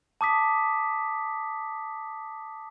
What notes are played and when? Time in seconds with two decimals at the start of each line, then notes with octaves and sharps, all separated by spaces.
0.21 A5 D6 D#6 B6